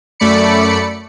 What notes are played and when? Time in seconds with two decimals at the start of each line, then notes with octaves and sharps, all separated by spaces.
0.20 F#2 A3 D5 B5 C#7